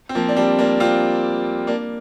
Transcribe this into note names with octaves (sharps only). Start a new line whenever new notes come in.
C4
F3 A#3
D4
G3 C4
A#3 D4
C4 F4
A#3 D4